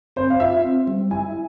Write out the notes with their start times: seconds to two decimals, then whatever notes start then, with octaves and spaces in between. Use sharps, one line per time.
0.16 C4 C5
0.30 F5
0.40 F4 E5
0.64 C4
0.87 G3
1.11 E4 G#5